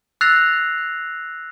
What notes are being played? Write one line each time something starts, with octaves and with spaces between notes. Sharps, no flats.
E6 F#6 A6 A#6 C7 F7